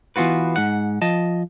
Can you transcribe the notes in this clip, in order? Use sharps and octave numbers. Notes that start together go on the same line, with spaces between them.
E3 B3 F4 F#4 B4
G#2 F#5
F3 D#5 A5